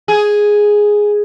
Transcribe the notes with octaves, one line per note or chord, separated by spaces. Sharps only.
G#4